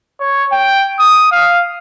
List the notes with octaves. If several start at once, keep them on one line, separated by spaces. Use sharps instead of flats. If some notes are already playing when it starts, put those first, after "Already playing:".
C#5
G5
D#6
F5